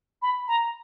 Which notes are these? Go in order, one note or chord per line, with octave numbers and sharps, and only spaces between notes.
B5
A#5